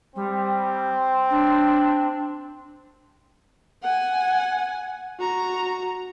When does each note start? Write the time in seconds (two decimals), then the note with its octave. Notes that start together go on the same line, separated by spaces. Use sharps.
0.15 G3 C4
1.30 D4
3.82 F#5 G#5
5.19 F#4 A#5